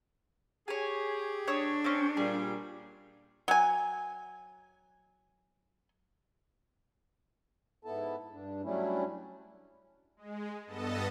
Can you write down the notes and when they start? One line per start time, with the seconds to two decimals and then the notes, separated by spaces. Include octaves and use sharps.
0.68 G4 G#4 C#5 G#5
1.48 D4 C#5 D#6 E6
1.84 C4 C#4
2.17 A#2 G3 G#4
3.48 F#3 G#5
7.85 G#2 B3 E4 A4 A5
8.32 G2 D4
8.63 F#3 G3 A3 C#4 D4 E4
10.17 G#3
10.66 G2 B3 A4 D#5 A5